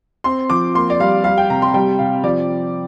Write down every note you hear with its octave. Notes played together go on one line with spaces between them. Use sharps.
C4 C6
F3 D6
A#3 C6
D5
G3 F5
G3 F5
G5
C3 A#5
C6
G3 G5
C3 F5
F3 D5